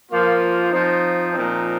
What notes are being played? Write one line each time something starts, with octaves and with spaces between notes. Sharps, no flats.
F3 A#3 F4
F3 C4 D#4
A#2 F3 C4 D#4